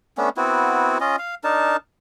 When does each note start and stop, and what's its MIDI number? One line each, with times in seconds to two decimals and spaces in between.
0.18 0.29 57
0.18 0.29 59
0.18 0.29 61
0.18 0.29 62
0.37 0.98 59
0.37 0.98 60
0.37 0.98 64
0.37 0.98 66
1.00 1.16 61
1.00 1.16 65
1.00 1.16 75
1.19 1.35 77
1.44 1.77 62
1.44 1.77 63
1.44 1.77 70
1.44 1.77 81